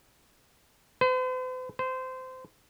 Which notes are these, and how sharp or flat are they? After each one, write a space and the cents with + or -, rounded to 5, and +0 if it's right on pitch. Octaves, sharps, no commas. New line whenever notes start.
C5 -45
C5 -20